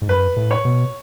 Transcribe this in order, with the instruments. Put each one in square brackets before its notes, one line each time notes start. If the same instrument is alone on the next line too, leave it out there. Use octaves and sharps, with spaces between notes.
[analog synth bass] G#2
[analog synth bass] F#2 [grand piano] B4
[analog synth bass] A2
[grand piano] C#5
[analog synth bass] B2